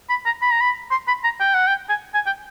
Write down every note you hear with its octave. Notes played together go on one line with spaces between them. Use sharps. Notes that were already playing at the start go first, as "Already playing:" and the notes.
B5
A#5
B5
A#5
B5
C6
B5
A#5
G5
F#5
G5
G#5
G#5
G5